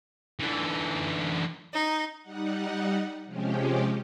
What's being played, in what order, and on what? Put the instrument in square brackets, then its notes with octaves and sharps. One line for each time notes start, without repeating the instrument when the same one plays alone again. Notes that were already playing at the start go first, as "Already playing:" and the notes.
[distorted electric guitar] D3 E3
[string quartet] D#4
[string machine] G3 D#4 F#5
C3 F3 G#3 C#4 G4